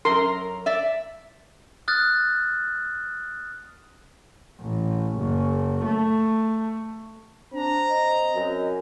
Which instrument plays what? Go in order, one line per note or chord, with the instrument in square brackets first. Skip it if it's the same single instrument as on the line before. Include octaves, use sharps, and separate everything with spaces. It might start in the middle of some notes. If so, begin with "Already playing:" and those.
[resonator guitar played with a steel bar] F#2 A#4 [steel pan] C6
[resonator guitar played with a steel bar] D5 E5
[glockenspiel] D#6 F6 F#6 A6
[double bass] A1
F#1
A3
[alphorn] C4 [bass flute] D4 [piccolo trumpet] A#5
[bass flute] D#5
[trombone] F#2